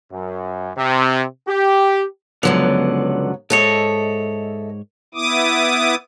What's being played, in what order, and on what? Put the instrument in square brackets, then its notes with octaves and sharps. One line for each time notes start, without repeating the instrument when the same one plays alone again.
[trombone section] F#2
C3
G4
[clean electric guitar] C#2 D3 F3 [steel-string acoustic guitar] F#2 F#3 B3
[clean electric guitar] G#2 C#5 [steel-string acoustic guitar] A4 D#5 E5
[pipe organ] B3 E4 D6 D#6